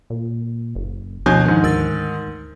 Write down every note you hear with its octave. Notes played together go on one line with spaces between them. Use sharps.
A#2
F#1
D2 B2 F3 D4 E4 G#5 G6
G#2 D#3
D2 A#4 E6 A6